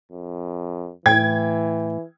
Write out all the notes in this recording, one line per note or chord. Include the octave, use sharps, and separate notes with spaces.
F2
A2 E3 G5 G#6